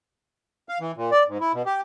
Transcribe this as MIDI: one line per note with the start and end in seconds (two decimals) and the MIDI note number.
0.69 0.78 77
0.80 0.92 52
0.97 1.11 46
1.11 1.23 74
1.28 1.38 44
1.41 1.52 64
1.54 1.63 47
1.66 1.81 67